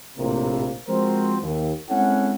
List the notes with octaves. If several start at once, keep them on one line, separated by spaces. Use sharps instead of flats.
A#1 A2 C3 A#3
F3 G#3 C4 F#4 A#4 C5
D#2
G#3 C4 C#4 E4 A4 F#5